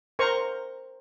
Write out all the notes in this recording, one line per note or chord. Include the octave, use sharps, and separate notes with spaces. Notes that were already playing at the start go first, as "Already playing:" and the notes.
A#4 C5 A#5 C#6